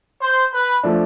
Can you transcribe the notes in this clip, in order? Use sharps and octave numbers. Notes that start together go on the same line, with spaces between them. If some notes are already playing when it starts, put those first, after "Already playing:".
C5
B4
F3 A3 D4